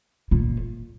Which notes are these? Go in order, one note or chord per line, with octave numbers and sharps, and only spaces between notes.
A#2